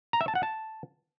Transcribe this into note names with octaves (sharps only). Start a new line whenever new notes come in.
A#5
E5
A5
F#5
A5